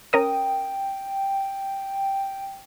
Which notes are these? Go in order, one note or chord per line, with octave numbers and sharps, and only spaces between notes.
C#4 A#4 G5 D#6